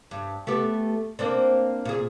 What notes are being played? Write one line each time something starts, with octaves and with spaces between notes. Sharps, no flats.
G2
A3 B3 G4
A#3 C4 D4
A#2 G#4